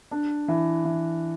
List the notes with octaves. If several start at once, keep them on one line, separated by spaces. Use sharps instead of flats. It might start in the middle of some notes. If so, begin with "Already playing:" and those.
D4
E3
E3